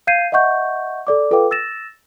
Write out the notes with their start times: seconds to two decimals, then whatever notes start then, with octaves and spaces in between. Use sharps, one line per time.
0.07 F5 G6 G#6 C7 D#7
0.32 D#5 E5 F#5 C#6 G6
1.07 A4 D5 D6
1.31 F4 A4 B4 F5 G5 D6
1.51 E6 A6 A#6 E7